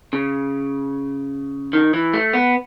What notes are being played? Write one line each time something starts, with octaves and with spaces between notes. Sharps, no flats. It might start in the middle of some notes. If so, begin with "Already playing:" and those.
C#3
D#3
E3
A3
B3